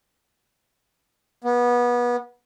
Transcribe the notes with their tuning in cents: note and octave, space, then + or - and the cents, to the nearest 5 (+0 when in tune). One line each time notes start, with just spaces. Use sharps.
B3 -25